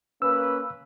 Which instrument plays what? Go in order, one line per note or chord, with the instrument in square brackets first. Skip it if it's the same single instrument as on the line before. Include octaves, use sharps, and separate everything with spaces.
[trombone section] A#3 C#4 B4 [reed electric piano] E6